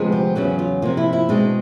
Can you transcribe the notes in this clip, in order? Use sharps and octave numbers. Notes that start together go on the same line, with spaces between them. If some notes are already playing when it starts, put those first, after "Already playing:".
Already playing: D2 C3 F3 G#3 B3
G4
E2 C#3 F#3 B3 F#4
F4
C3 F3 A#3 F4
E4
E4
B2 G#3 C4 D4